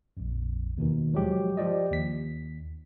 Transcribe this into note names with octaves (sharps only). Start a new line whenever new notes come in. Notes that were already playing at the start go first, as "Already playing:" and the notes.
A#1 F2
D#2 B2 D#3
F3 F#3 G#3 G4
F3 G4 D5 D#5
D#2 B6